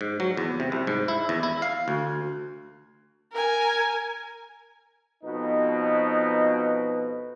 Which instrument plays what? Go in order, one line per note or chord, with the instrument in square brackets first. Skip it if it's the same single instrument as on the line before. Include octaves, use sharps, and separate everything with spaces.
[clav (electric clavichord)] G#2
F#3
E2
C3
C2
G#2
E4
E2
E4
F5
D2
[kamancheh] A#4 G#5
[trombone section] F2 B2 D#4 B4